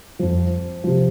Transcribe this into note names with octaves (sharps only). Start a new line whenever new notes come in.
F2 F3
C3 F3